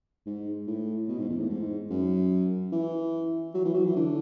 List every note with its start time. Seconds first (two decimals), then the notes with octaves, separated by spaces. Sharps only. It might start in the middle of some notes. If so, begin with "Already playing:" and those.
0.26 G#2
0.67 A2
1.08 B2
1.18 G#2
1.29 E2
1.39 A2
1.50 G#2
1.90 F#2
2.72 E3
3.54 F#3
3.65 E3
3.74 F#3
3.85 E3
3.96 D3